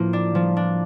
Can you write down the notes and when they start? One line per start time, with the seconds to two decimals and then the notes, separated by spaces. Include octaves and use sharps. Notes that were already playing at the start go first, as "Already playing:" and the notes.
Already playing: A2 F3 A#3
0.13 D4
0.35 F3
0.57 D4